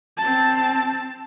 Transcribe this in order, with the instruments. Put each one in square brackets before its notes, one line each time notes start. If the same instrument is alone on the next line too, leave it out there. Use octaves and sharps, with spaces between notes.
[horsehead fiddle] C4 A5